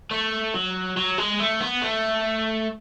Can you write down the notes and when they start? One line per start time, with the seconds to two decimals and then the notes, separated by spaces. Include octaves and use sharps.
0.11 A3
0.54 F#3
0.97 F#3
1.18 G#3
1.39 A3
1.60 B3
1.81 A3